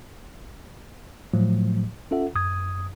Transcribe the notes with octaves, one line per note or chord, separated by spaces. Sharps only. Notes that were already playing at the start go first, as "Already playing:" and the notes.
A2 F3 F#3 A3
C#4 F4 A4 E5 F#5
F#2 D#6 G#6